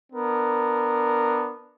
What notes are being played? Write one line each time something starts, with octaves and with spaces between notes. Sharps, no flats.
B3 D4 A#4